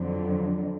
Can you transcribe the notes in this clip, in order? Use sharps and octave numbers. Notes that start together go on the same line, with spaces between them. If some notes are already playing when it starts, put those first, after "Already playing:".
Already playing: F2 D3 F#3